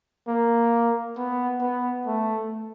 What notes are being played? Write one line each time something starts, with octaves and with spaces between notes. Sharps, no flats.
A#3
B3
B3
A3